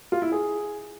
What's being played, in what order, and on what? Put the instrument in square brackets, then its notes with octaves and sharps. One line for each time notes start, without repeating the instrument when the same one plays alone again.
[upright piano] F4
E4
G#4